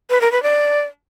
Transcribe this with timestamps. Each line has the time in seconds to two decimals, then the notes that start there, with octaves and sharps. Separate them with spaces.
0.10 B4
0.21 A#4
0.32 B4
0.43 D5